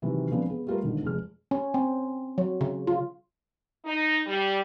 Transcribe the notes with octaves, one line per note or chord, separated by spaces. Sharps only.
C3 D#3 E3 F#3
C#3 F3 G#3 B3 C4 D4
B3 G#4
G3 A3 F4 G4 A4 A#4
G#1 G#2 D3
F1 G#3 F6
C#4
C4
F#3
C#3
F4
D#4
G3